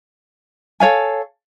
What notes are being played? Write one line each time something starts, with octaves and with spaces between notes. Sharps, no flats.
A4 C#5 F5 G#5